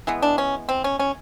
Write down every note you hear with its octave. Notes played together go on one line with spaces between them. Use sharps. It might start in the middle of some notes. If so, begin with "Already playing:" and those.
E3 G#3 B3
D4
C#4
C4
C#4
C#4